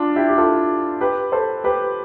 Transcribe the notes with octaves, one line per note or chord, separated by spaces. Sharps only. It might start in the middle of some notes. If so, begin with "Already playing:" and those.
Already playing: D4 F4
E4 G4
G4
F4 A4
G4 B4
A4 C5
G4 B4